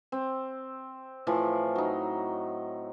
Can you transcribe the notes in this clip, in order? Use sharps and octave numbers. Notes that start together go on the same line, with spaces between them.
C4
A2 E3 F3 F4
F#3 D#4